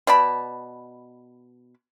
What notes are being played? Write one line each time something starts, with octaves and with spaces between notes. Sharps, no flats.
B2 D5 A5 B5